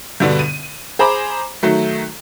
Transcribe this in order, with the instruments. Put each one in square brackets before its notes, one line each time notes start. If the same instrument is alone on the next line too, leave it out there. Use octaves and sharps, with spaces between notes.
[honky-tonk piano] G2 B2 D3 B3 D4
D#7
G#4 C5 A#5 B5 D6
D#3 F#3 A3